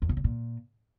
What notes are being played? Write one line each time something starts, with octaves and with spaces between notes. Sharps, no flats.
E2
C3
C#3
A#2